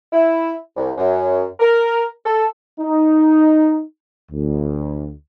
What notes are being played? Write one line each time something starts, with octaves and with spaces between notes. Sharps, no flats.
E4
C2
F#2
A#4
A4
D#4
D2